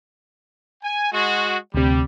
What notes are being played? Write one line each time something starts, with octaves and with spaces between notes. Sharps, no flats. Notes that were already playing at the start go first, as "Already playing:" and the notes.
G#5
G#3 F#4
D2 C3 G3